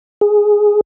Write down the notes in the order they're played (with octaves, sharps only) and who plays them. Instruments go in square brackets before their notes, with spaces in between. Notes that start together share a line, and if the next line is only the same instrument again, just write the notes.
[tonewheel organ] G#4